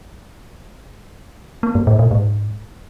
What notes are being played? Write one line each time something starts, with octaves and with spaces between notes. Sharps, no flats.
A#3
G2
A2
A#2
G#2